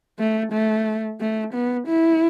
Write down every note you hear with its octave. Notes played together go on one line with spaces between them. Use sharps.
A3
A3
A3
B3
E4